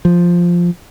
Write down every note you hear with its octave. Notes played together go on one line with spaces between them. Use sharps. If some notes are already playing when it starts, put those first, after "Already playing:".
F3